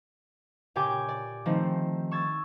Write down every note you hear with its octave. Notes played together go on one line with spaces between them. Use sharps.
A#2 C#3 G4 G5 G#5 D6
D5
D#3 F3 A3 C4
C#6 E6 G#6 A6